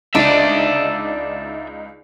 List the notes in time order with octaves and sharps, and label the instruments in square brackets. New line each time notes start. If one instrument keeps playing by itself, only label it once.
[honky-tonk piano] C#2 D#4 D#7 [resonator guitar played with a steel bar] D4 [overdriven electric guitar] D5 E5